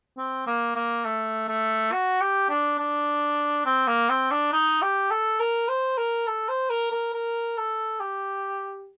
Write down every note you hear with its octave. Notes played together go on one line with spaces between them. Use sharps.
C4
A#3
A#3
A3
A3
F#4
G4
D4
D4
C4
A#3
C4
D4
D#4
G4
A4
A#4
C5
A#4
A4
C5
A#4
A#4
A#4
A4
G4